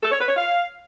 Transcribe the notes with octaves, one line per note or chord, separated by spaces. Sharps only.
A4
C#5
B4
C#5
F5